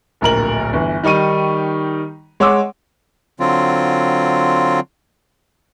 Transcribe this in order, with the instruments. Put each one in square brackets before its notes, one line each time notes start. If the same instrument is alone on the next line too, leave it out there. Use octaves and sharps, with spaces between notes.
[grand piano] D1 A#1 A#4 F#7
G1 E3
D#3 G3 D#4 C#6 D#7
G#3 C#5 F#5 C6 D6 E6
[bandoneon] D3 F#3 C4 F4